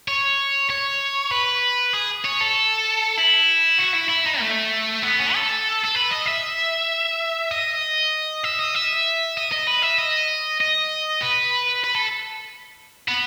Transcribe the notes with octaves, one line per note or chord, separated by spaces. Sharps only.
C#5
C#5
B4
G#4
C#5
A4
E4
F#4
E4
E4
D#4
A3
B3
C#4
A4
A4
B4
D#5
E5
D#5
E5
D#5
E5
D#5
D#5
B4
E5
D#5
D#5
B4
B4
A4
B3